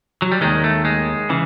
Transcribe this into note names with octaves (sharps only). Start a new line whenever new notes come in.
F#3
G3
D#2 D#3 G#3
A3
G#3
C#3 E3